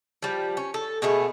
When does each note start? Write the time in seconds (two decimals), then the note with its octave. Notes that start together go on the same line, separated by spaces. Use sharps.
0.22 F3 G3
0.57 C#4
0.74 A4
1.02 B2 G#3 A3 B3